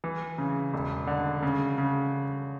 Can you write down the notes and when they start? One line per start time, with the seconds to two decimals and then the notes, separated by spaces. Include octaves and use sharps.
0.04 E3
0.38 C#3
0.74 E1
1.07 D3
1.42 C#3
1.78 C#3